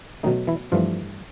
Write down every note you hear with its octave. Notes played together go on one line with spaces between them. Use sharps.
B2 D#3 F#3 A3 D#4
E3 E4
G2 E3 F3 A3 F4